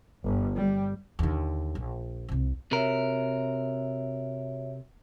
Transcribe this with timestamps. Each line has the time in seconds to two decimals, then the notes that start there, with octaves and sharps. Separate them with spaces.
0.24 G1
0.56 G3
1.19 D#2 D3
1.75 A#1
2.28 C2 C3
2.72 C3 F#4 A#4 C#5 E5